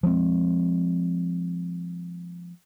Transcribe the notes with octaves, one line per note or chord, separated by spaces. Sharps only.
F3 G#3 A#3 C4